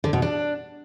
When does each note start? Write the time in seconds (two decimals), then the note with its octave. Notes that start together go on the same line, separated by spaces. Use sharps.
0.04 D3
0.13 B2
0.22 D4